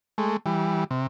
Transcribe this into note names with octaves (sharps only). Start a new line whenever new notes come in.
G#3 A3
E3 G3
C3